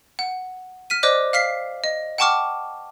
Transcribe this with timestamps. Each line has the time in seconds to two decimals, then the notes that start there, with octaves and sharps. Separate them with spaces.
0.19 F#5
0.90 F6 B6 D#7
1.03 C5 D5 D#5 D6 F#6
1.33 F5 F6 B6 C7
1.84 D#5
2.18 F#5 G5 A5 C#6 D6 F6